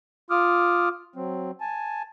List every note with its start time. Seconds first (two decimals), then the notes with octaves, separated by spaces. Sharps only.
0.30 F4 D6 D#6 F6
1.16 F#3 C4
1.61 G#5 A5